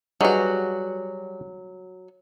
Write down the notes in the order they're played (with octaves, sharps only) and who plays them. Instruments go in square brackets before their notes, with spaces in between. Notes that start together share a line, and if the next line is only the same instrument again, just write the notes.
[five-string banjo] F#3 F#4 [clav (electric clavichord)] G3 G#4 C#5 [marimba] B4 D#5